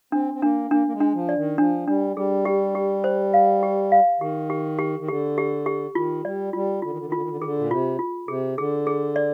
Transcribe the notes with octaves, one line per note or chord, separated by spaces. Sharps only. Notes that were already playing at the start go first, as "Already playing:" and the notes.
C4 D4
C4
A#3 D4
A#3 D4
A#3
G#3
D4
F3
D5
D#3
F3 D4
G3 D4
G3 G#4
G4
G4
C5
F5
G4
F5
D#3 G4
G4
G4
D#3
D3 G4
G4
G4
D#3 F4
G3 D5
G3 F4
D3 F4
D#3
D3
D#3
D3 F4
D#3
D3
D#3
D3 G#4
A#2
C3 F4
F4
C3 G#4
D3 G#4
G#4
D5